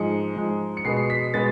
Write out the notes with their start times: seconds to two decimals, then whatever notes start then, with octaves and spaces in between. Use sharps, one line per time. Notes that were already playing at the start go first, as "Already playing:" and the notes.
Already playing: G#2 F3 G#3 C#7
0.36 G#2 F3 G#3
0.77 C#7
0.85 B2 G#3 B3 C7
0.97 C7
1.10 B6
1.34 B2 G#3 B3 A6